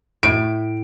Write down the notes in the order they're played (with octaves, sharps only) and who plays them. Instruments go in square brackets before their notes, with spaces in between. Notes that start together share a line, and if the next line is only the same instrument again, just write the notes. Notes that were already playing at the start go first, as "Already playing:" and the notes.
[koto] A2 [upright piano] D7